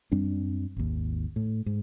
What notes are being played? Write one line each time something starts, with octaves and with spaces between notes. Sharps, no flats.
F#2 G3 C4 D4
G#1 D#2
A2
G#2